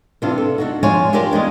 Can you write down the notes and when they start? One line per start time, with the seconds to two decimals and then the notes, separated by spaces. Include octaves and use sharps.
0.22 C3 E3 G3 D4 F4
0.38 A4
0.58 D4 D#4 F#4
0.83 F3 G#3 C#5 D5 G#5
1.13 D4 F4 G4 A#4 D5
1.31 E2 G#3 C#4 D#5